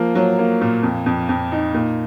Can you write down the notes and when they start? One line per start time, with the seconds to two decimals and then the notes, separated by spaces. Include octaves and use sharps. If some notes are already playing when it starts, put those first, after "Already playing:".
Already playing: F3 A#3
0.15 F#3
0.39 A#3
0.61 A#2
0.83 F2
1.06 F2
1.29 F2
1.52 D#4
1.74 A#2